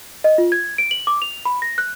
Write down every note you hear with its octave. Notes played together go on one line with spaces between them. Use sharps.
D#5
F4
G#6
D7
F#7
D6
F7
B5
A#6
F#6